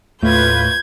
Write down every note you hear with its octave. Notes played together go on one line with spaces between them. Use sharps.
D#2 A2 A3 F4 B4 G6 G#6